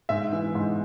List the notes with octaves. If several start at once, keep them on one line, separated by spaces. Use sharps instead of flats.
G#2 E5
E3
G#2